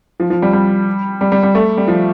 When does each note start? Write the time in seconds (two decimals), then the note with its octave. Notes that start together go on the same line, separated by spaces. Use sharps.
0.20 F3
0.30 F3
0.42 G3
0.53 G3
1.21 G3
1.32 G3
1.43 G3
1.55 A3
1.77 G3
1.88 F3